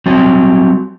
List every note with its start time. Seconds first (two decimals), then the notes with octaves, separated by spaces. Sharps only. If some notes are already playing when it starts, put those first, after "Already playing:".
0.06 F#3 G3 C4